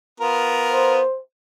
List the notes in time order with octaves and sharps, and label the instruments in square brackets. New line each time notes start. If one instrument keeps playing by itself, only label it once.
[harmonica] B3 F4 A#4
[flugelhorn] C5